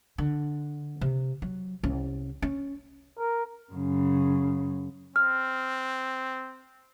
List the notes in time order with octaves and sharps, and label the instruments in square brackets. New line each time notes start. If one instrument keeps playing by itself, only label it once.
[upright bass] D3
C3
F#3
C2 C#4
C#4
[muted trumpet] A#4
[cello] F#2 C#3
[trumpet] C4 [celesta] F6